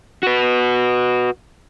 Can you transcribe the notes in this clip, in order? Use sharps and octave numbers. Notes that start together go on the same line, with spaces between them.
F#4 B4